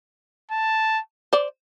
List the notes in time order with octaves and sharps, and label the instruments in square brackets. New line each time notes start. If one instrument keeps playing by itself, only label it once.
[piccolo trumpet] A5
[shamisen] C5 D5